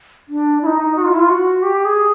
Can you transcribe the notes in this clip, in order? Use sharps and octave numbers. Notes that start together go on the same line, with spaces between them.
D4
E4
D#4
F#4
F4
E4
F4
F#4
G4
G#4